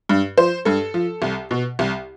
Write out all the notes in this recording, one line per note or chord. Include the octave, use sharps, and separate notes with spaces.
G2
F3 C5
G2 A4
F3
C2
B2
C2